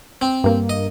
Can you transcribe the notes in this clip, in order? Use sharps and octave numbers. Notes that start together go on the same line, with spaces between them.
C4
G2 A#3
D#5